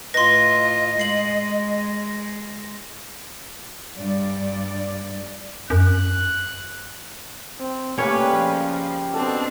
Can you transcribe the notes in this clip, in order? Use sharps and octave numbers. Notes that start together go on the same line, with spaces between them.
A2 F4 B4 D#5 C6 A#6
G#3 C7 F#7
G2 D5
F#2 F#6
C4
C#3 G3 A3 A#3 C#4 B4 C#5
F3
B2 C4 D4 A4